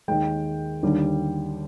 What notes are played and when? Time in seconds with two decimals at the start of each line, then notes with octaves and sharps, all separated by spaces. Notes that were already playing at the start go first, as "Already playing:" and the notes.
0.08 D#2 D#3 G#3 G5
0.83 D#2 D3 G3